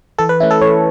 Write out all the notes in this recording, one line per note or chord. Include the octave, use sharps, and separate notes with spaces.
E3 A4
B4
A3 C#4 E4
A4
E3 C#5